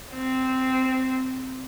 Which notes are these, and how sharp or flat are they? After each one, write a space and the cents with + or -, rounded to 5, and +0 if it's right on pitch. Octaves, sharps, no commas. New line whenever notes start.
C4 -10